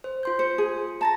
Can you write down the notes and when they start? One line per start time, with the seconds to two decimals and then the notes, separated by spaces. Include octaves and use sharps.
0.04 C5
0.23 F4 C6 G6
0.39 C5 C#7
0.58 F4 G#4
1.01 A5 A#5 A6 A#6